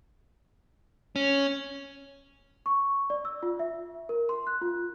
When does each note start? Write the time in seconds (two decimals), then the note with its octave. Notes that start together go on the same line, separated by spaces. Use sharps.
1.16 C#4
2.66 C#6
3.10 D5
3.25 E6
3.43 F4
3.59 E5
4.09 A#4
4.29 C6
4.47 F#6
4.62 F4